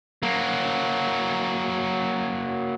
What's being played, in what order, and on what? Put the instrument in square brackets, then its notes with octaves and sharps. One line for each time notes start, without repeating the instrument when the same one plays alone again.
[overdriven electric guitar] F#3 A#3